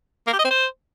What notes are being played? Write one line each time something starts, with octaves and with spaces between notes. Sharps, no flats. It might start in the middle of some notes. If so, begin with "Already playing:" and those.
A#3
G4
D#5
C4
C5